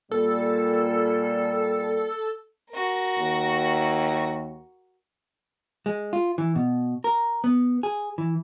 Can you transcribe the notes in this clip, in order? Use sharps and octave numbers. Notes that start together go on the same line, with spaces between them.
A#2 G3 A4
F#4 A#4
D#2
G#3
F4
E3
B2
A#4
B3
G#4
E3